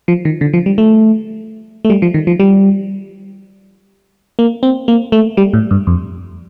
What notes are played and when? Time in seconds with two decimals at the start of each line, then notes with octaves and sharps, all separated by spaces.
0.08 F3
0.25 D#3
0.41 D3
0.54 F3
0.66 G3
0.78 A3
1.85 A3
1.90 G3
2.02 F3
2.14 D#3
2.27 F3
2.40 G3
4.39 A#3
4.63 C4
4.88 A#3
5.12 A3
5.37 G3
5.53 A2
5.71 G2
5.87 F2